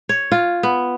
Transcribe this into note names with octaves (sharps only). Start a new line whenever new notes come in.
C#5
F4
B3